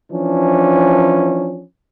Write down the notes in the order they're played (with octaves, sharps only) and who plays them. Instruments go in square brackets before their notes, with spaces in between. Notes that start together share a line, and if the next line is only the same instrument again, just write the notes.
[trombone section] E3 F3 C#4 D4